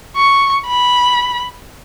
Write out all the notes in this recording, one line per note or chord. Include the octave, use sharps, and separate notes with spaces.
C#6
B5